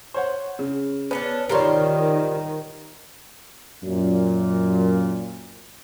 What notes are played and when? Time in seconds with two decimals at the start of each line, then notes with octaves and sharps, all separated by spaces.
0.14 C5 C#5 F#5
0.59 C#3
1.11 B3 C#4 D4 B4
1.49 D#3 G3 F4 A#4 C5 C#5
3.84 F#2 A#2